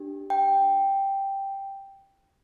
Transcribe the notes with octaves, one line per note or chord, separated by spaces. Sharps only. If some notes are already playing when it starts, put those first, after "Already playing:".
Already playing: D4 G4
G5